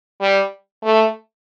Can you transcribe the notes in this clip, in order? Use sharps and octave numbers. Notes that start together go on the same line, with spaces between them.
G3
A3